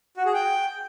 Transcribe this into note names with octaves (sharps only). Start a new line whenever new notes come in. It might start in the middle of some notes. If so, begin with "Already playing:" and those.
F#4
G#4
G5